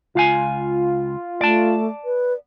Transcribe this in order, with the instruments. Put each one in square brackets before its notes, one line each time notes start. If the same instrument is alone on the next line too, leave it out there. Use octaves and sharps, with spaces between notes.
[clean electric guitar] C#2 F5 G#5 [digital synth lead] F4
[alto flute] A3 [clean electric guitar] D5 A5
[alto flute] B4